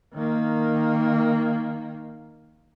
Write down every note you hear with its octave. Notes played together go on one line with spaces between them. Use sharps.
D#3 A#3